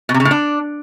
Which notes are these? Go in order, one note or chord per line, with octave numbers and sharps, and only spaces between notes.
B2
C3
C#3
A2
D4